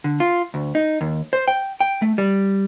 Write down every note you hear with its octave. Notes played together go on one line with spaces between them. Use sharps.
D3
F4
D2
D#4
D#2
C5
G5
G5
A3
G3